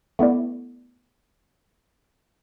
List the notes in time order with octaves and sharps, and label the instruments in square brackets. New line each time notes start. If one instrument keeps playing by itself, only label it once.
[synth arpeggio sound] A3 B3 E4 D5